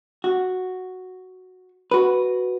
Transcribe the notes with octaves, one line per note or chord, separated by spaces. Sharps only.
F#4
F#4 B4